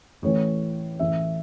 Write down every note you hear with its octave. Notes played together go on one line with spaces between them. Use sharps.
A1 A2 E3 C#5
A1 A2 E3 E5